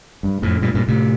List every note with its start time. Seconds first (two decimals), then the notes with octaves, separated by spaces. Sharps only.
0.23 G2
0.42 F2 A2
0.62 G2 A#2
0.74 G2 A#2
0.88 A2 C3